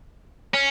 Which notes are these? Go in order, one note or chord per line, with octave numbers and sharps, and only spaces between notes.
C#4